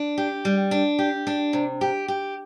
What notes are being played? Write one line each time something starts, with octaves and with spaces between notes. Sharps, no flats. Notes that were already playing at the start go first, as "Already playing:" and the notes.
Already playing: D4
G4
G3
D4
G4
D4
C3
G4
G4